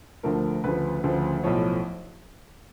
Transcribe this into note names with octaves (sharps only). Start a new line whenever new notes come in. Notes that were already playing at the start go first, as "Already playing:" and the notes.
D2 D3 F3 A3 A#4
D2 C#3 F3 B4
D2 C#3 F3
B1 A2 F3 C#5